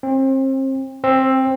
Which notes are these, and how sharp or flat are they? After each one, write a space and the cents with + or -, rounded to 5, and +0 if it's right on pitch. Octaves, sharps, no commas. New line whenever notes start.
C4 +35
C4 +15